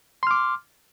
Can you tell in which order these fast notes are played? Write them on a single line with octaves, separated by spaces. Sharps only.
C6 F6 D6